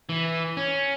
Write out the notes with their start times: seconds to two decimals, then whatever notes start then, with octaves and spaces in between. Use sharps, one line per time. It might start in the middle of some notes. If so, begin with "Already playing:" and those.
0.09 E3
0.57 C#4